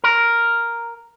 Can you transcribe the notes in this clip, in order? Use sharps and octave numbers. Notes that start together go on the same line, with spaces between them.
A#4